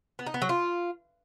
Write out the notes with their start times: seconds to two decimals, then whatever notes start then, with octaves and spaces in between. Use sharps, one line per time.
0.19 B3
0.27 D#4
0.34 B3
0.42 F#3
0.49 F4